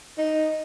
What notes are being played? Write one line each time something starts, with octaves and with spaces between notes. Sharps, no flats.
D#4